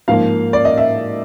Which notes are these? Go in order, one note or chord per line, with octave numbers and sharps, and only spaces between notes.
G#2 F3 A#3 F5
D5
D#5
E5